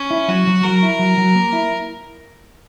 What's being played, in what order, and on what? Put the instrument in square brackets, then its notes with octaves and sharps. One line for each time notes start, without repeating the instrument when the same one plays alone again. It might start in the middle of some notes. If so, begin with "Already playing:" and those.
Already playing: [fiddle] C#4
[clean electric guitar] E4
[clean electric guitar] F#3 [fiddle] F#4
[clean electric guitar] F#3
[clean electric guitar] F#3 [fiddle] A#4
[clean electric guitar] E4
F#3
F#3
A#3
E4